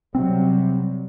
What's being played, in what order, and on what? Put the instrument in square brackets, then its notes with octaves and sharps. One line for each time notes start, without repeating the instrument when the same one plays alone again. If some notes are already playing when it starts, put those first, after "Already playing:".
[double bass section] C3 F#3 G3 [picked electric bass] C4